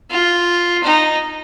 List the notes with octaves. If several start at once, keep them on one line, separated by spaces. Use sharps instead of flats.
F4
D#4